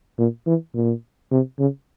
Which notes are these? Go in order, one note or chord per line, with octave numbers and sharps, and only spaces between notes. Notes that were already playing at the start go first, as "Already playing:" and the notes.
A#2
E3
A#2
C3
C#3